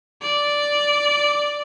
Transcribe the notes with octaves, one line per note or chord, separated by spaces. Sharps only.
D5